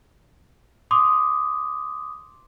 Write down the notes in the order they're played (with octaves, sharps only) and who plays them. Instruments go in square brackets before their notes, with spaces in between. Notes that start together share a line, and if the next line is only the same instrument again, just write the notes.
[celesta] C6 D6 D#6